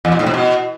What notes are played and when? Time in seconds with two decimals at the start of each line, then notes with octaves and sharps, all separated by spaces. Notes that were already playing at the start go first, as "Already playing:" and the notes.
0.05 E2
0.12 B2
0.19 A2
0.26 C3
0.34 B2